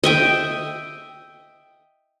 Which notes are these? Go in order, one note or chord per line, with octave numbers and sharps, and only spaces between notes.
D#5 E5 G5